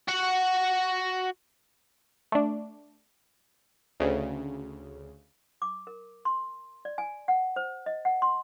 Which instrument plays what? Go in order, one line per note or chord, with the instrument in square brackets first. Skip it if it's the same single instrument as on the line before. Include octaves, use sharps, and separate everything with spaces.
[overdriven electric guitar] F#4 F#5
[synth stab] A3 D4
D2 C#3
[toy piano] D6
A#4
C6
D5
G#5
F#5
C5
D#5
F#5
C6